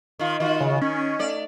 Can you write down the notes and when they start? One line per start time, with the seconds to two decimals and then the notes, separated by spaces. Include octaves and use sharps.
0.19 D#3 F4
0.40 D#3 F4 F#4
0.60 C#3
0.81 D#3 C#4
1.19 A3 D5